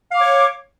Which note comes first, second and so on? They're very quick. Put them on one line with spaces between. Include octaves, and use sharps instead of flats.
F5 D6 C#5